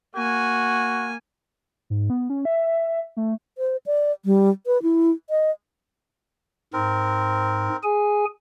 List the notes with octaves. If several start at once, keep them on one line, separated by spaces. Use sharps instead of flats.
A#3 F#4 G#5
G#2
B3
C#4
E5
A3
C5
D5
G3
B4
E4
D#5
G#2 C4 A#4
G#4 G#5